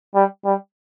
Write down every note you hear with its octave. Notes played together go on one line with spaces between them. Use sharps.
G3
G3